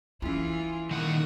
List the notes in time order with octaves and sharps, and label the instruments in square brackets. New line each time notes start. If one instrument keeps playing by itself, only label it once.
[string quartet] E3 F4 G#4 [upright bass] C#4 E4
[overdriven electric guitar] D#3 F#5 [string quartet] A#3 C#6 D#6